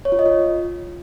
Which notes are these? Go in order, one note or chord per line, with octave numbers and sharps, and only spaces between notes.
C#5
F4
D#5
F4